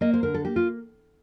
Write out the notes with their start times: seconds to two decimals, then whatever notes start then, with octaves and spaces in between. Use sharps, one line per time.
0.01 A#3 D#5
0.14 C5
0.23 D3 A#4
0.34 A4
0.45 A#3 G4
0.56 F4